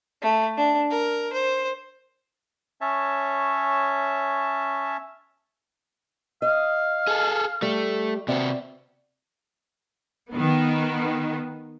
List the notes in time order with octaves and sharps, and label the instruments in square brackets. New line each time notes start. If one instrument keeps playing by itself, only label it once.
[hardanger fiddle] A3
D4
A#4
C5
[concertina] C#4 C#5 E5 A5
[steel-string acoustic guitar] D#5 [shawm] F5
[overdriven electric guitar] G#4 A4
[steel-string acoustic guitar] G3 [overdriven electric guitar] A3
[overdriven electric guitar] C3 F#4 [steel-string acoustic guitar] C4 D5 E5
[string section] D#3 B3